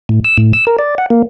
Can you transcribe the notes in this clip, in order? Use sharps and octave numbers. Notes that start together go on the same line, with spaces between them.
A2
E6
A2
E6
A#4
D5
F#5
A#3